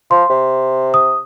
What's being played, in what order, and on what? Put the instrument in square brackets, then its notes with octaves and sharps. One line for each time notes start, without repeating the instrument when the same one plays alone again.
[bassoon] F3 [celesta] C6
[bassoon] C3
[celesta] D#6